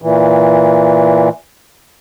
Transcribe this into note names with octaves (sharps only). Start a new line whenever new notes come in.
A#2 E3